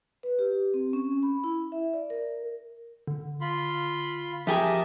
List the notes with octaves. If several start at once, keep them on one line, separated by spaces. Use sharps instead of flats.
B4
G4
C4
C#4
B5
E4
E5
D5
A#4
D3
F4 B5 C6
F2 G4 G#4 A#4 E5 A5 D#6